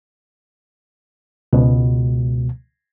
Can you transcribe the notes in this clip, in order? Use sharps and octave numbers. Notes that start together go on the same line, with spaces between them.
C#2 B2